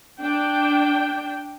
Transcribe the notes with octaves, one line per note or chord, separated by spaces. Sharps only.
D4 G5